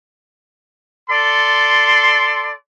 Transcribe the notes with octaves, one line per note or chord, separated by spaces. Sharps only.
A4 D5 C6